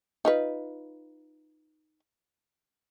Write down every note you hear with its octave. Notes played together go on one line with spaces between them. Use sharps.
D#4 F4 B4